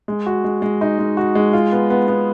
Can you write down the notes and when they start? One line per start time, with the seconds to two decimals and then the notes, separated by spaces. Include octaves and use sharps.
0.08 G#3
0.26 F#4
0.44 G#3
0.62 G#3
0.81 D#4
0.99 G#3
1.17 F#4
1.35 G#3
1.53 F4
1.72 B3
1.90 B3
2.08 B3